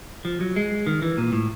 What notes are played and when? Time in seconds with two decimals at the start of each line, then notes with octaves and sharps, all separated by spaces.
0.25 F3
0.41 F#3
0.56 G#3
0.87 D#3
1.02 E3
1.18 A#2
1.33 A2